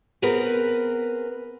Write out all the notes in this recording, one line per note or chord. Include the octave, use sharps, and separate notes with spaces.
B3 C4 G#4 A#4 B4